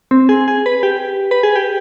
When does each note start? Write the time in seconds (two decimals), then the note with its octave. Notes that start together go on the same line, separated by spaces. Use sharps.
0.11 C4
0.29 G#4
0.48 G#4
0.66 B4
0.83 G4
1.31 B4
1.43 G#4
1.56 G4